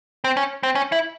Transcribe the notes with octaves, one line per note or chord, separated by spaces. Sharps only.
C4
C#4
C4
C#4
E4